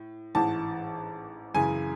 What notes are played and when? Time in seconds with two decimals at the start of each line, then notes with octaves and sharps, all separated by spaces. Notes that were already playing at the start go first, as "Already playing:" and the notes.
Already playing: A2
0.35 A1 G#2 E3 A5
1.55 F#2 C#3 E3 G#5